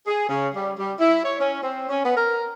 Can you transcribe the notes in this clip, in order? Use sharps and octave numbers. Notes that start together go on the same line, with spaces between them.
G#4
C#3
G3
G3
E4
C#5
C#4
C4
C#4
B3
A#4